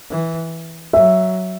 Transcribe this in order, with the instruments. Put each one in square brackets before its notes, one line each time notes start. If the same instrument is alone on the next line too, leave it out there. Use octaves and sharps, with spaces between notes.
[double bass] E3
[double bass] F#3 [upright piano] E5